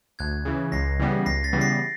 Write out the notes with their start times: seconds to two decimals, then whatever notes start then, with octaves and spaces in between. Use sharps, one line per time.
0.19 D2 F#6 G#6
0.45 C#3 E3
0.72 C#2 A#6 C7
0.99 C#3 E3 G3 B3
1.26 C#2 A#6 C7
1.44 A6 B6
1.53 C#3 E3 G3 B3
1.61 A#6 C7